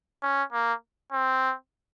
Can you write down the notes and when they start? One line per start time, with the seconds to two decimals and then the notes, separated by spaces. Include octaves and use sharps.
0.22 C#4
0.52 A#3
1.12 C4